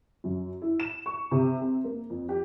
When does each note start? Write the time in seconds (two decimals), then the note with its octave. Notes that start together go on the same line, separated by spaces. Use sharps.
0.24 F#2
0.62 E4
0.80 E7
1.06 C#6
1.31 C3
1.61 C4
1.84 A#3
2.10 F2
2.29 G4